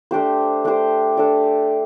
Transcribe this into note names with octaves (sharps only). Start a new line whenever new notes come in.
A3 D4 G4 C5
A3 D4 G4 C5
D4 A4 D5